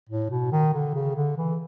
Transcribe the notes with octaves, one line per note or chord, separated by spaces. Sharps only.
A2
B2
D#3
D3
C#3
D3
E3